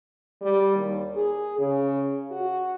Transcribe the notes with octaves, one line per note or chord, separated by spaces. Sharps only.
G3
D#2
G#4
C#3
F#4